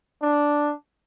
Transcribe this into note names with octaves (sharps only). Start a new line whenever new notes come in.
D4